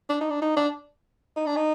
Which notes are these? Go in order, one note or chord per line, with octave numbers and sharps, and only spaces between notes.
D4
D#4
D4
D#4
D4
D#4
D4
D#4